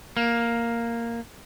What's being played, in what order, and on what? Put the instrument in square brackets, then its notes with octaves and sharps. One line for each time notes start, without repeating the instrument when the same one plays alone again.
[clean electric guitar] A#3